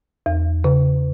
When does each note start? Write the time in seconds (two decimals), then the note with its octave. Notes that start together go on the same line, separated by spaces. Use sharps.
0.26 E2
0.64 C#3